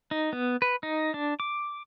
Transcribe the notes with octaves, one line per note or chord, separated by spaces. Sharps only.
D#4
B3
B4
D#4
D4
D6